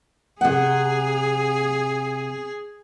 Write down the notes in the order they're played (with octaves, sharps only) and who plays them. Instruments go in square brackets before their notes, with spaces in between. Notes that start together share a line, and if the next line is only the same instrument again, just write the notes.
[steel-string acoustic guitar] C3 F#5 [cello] G#4